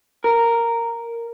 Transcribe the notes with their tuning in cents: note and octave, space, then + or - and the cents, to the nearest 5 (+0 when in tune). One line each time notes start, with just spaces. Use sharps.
A#4 -5